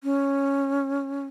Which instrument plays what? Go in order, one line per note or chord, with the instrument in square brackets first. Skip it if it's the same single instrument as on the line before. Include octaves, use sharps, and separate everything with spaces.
[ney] C#4